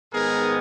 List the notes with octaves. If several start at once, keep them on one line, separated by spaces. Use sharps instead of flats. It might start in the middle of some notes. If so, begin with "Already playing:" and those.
G#2 D#3 G#3 B3 G#4 A#4